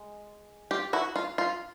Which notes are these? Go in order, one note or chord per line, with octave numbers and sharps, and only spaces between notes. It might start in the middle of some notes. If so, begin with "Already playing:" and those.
Already playing: G#3
F4 G4
E4 F#4
F4
F4